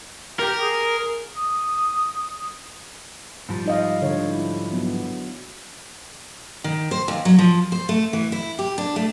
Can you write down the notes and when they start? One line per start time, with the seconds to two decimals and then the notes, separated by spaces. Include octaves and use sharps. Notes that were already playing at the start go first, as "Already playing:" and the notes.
0.39 G4 A#4
0.60 G#4
1.36 D#6
3.49 G#2 F3 G3
3.66 D#4 D#5 F5
4.02 D3 C#5
4.30 E4
4.73 F#3 B3
6.64 D#3
6.91 C5
7.08 D#2
7.25 F#3
7.39 F3
7.72 C5
7.89 A3
8.13 E3
8.32 E4
8.59 G4
8.78 D4
8.96 A3